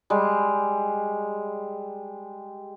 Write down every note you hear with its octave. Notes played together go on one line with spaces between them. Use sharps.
G3 G#3